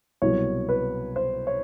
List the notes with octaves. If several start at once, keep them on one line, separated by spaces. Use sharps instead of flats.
C2 B2 F#3 C#5
B4
C5
C#5